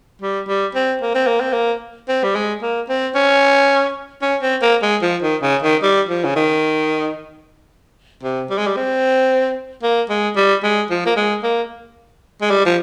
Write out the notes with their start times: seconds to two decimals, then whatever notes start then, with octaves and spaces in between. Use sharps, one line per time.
0.22 G3
0.48 G3
0.75 C4
1.02 A#3
1.14 C4
1.27 A#3
1.41 C4
1.53 A#3
2.08 C4
2.24 G3
2.35 G#3
2.62 A#3
2.89 C4
3.15 C#4
4.22 C#4
4.42 C4
4.62 A#3
4.82 G#3
5.02 F3
5.22 D#3
5.42 C#3
5.62 D#3
5.83 G3
6.09 F3
6.25 C#3
6.36 D#3
8.23 C3
8.50 G3
8.58 G#3
8.67 G3
8.76 C4
9.83 A#3
10.10 G#3
10.36 G3
10.63 G#3
10.90 F3
11.06 A#3
11.17 G#3
11.43 A#3
12.41 G#3
12.50 G3
12.66 F3